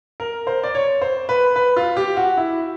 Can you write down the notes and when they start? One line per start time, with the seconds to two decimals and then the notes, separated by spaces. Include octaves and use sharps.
0.20 A#4
0.47 C5
0.63 D5
0.75 C#5
1.01 C5
1.29 B4
1.56 B4
1.77 F4
1.97 G4
2.17 F#4
2.37 E4